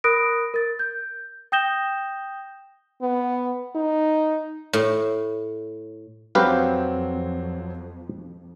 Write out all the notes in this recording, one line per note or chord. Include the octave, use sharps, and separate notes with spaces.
A#4 B5 D#6 F#6 A#6 D7
A#4 A6
G6
G5 D#6 G6 A#6 E7 G7
B3
D#4
A2
F2 F#3 C4 G4 B4 F5